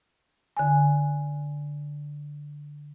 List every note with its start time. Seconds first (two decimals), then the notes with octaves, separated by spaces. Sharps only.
0.57 D3 G#5